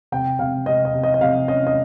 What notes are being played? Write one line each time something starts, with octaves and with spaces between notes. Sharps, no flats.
C3 G5
C3 F5
C3 D#5
D#5
C3
D#5
D#5
C3 F5
C#4 D#5
D#5